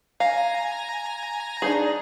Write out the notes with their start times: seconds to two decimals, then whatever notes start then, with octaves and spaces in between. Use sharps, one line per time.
0.20 F5 G#5 A#5 A#6
1.62 D4 D#4 G#4